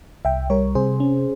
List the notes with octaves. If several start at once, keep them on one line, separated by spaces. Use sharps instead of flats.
C2 E5 G5
G3 A#4 C#5
C3 G#4 C5
C#4